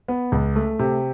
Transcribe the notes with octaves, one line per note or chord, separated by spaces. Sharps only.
B3
C#2
A3
C3